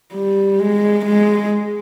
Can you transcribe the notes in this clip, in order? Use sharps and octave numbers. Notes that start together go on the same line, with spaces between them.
G3
G#3
G#3